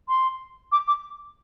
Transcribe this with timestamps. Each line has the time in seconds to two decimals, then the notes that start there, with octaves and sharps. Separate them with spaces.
0.08 C6
0.72 D6
0.88 D6